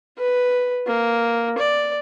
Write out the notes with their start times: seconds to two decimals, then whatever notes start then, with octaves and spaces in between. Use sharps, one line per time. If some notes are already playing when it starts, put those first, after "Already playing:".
0.18 B4
0.87 A#3
1.58 D5